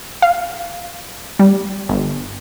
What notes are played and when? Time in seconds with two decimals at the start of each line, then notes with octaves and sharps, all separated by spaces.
0.22 F5
1.39 G3
1.89 G1